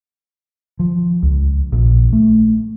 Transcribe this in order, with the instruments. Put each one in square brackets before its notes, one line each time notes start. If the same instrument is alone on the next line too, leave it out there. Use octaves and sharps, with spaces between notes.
[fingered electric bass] F3
C#2
A#1
A3